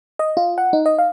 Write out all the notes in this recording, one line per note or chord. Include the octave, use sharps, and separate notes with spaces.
D#5
F4
F#5
D#4
D#5
F5